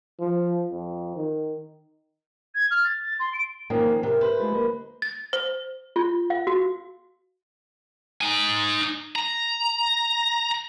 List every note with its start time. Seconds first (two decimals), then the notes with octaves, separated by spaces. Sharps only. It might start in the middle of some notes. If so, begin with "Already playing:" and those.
0.20 F3
0.71 F2
1.16 D#3
2.55 G#6
2.71 F6
2.84 A6
3.01 A6
3.20 C6
3.33 D7
3.70 D#3 F3 A#3 C#4
4.03 C3 E4 A#4
4.21 B4 C5
4.40 G#3 A3 F4
4.51 D2 A#3 D#5
5.02 A6
5.33 C5
5.96 F4
6.30 F5
6.47 F#4
8.21 D#4 G#5
9.16 A#5